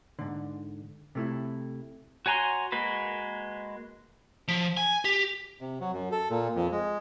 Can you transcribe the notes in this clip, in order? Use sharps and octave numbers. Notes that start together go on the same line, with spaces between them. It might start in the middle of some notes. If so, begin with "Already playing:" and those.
G#2 D3
C3 A3 E4
F#4 C#5 G#5 A#5 C6
G#3 A#3 F#4 B4
F3
G#5
G4
C3
F#3
F#2
A4
A#2
F2
G#3